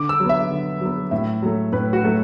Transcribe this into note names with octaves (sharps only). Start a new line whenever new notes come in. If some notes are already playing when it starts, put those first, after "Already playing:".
Already playing: D3 D6
E6
F#3 B3
E5
D3
F#3 B3
A2 E5
F#3 A3
A2 B4
F#4
F#3 A3